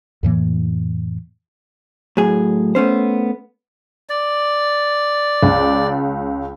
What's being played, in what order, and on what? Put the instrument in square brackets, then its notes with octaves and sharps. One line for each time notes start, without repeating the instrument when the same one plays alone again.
[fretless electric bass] F2 A2 E3 A#3
[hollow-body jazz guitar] A2 F#3 G#4
A3 B3 C#4 C5
[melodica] D5
[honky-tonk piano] C#2